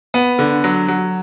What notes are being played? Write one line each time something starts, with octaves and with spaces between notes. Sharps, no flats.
B3
D3
F#3
F#3